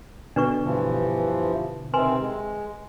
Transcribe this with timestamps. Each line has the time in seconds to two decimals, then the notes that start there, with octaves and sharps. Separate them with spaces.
0.36 B2 D3 D4 B4 C#6
0.64 G2 E3 F3
1.94 C3 D#3 C4 B4 G#5 C6
2.21 G#3